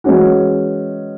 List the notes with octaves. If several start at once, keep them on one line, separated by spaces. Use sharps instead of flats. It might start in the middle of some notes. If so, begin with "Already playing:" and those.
E3 G#3 C#4 F#4